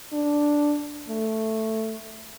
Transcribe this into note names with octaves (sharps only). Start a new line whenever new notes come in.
D4
A3